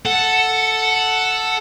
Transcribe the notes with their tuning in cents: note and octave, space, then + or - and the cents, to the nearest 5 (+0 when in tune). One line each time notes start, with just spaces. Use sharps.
A4 +0 F#5 +0